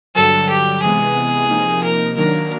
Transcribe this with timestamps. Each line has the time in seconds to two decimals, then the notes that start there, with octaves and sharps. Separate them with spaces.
0.15 G2 D3 F#3 A4
0.49 G4
0.82 C3 E3 G#3 B3 G#4
1.49 C3 F3 A#3 D#4
1.84 A#4
2.17 D#3 F#3 A#3 D4 A#4